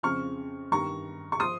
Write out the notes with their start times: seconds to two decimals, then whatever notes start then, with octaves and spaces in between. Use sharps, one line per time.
0.03 F2 C#3 F3 C#6 F6
0.72 G2 D#3 A#5 C#6
1.32 C#6
1.40 F3 C6 D#6